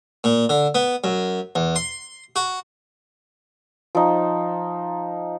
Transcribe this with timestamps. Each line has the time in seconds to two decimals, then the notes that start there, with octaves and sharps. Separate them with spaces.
0.24 A#2
0.49 D3
0.75 B3
1.04 F#2
1.55 E2
1.76 C6
2.36 F#4
3.95 F3 D#4